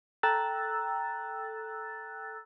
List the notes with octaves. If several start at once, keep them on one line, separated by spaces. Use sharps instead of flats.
A4 G5 A#5 E6 F#6 A6